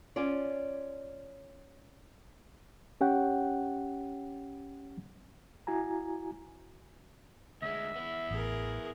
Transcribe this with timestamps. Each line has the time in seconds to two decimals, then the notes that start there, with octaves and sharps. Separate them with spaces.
0.16 C#4 F4 D5
3.01 C#4 G4 C#5 F#5 G5
5.67 E4 F#4 G#5 A#5
7.62 D2 G#3 E5
7.96 B3 E4
8.31 A1 G#4 A#4